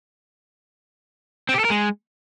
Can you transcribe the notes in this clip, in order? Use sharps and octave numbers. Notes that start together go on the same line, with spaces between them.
C4
G4
A4
A#4
G#3